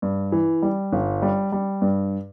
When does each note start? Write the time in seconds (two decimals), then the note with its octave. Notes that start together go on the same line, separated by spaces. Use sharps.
0.02 G2
0.32 E3
0.62 G3
0.93 G1
1.22 G3
1.52 G3
1.82 G2